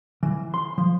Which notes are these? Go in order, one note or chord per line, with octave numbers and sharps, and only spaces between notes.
E3
C6
F3